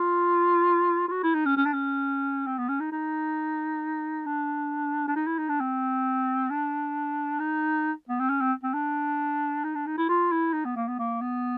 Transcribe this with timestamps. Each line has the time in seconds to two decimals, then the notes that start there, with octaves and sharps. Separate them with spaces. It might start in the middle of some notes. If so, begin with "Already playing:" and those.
Already playing: F4
1.08 F4
1.12 F#4
1.23 E4
1.35 D#4
1.46 C#4
1.57 C#4
1.66 D4
1.73 C#4
2.46 C4
2.58 B3
2.69 C#4
2.80 D#4
2.92 D#4
4.26 D4
5.08 D4
5.16 D#4
5.27 E4
5.38 D#4
5.49 D4
5.60 C4
6.50 D4
7.40 D#4
8.09 B3
8.20 C4
8.29 C#4
8.41 C4
8.63 C4
8.74 D4
9.64 D#4
9.75 D4
9.87 D#4
9.98 E4
10.09 F4
10.32 E4
10.53 D#4
10.65 B3
10.76 A#3
10.88 B3
10.99 A#3
11.21 B3